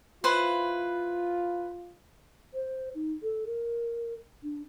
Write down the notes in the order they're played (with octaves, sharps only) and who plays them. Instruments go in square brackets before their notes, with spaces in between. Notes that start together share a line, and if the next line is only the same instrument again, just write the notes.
[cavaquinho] E4 B4 C5 [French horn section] F4
[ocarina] C5
D#4
A4
A#4
D4